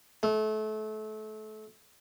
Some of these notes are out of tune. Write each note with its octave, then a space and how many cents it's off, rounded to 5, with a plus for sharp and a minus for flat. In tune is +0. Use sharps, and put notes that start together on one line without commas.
A3 -30